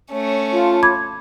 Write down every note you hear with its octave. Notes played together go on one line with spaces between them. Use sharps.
A3 C#4 C#5
F4 A5
B5 D6 G#6